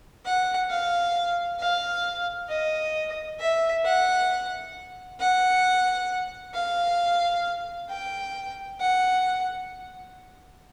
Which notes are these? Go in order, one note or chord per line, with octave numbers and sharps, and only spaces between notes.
F#5
F5
F5
D#5
E5
F#5
F#5
F5
G5
F#5